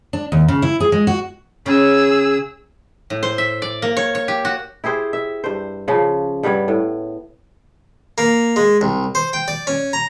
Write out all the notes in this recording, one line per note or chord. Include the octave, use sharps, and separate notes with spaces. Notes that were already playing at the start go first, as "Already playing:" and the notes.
D4
D#2
C#3
E4
G#4
G#3
F#4
C#3 G#4 E6
A2
C5
E5
D5
A#3
C#5
C#5
G4
F#4
E4 G4 G#4 C5
E5
G2 C5
C#3 F3
G2 G3 B3 C#5
A2
A#3
G#3
C2
C5
G5
D5
C#4
A#5